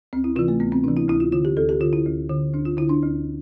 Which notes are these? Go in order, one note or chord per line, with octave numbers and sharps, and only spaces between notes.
D2 C4
E4
C3 E3 F4
A3
D2 B3
C4
C3 E3 D4
E4
D2 E4
F4
D3 F4
G4
D2 A4
G4
D3 F4
E4
D2
D3
D2 D4
F4
D3 E4
D4
D2